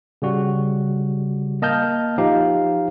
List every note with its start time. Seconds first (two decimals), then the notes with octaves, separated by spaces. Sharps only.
0.22 C#3 G3 F#4
1.62 A#3 D#5 A5 F6 G6
2.18 F3 D#4 G4 F5